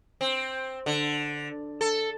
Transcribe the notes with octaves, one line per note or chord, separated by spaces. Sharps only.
C4
D3
A4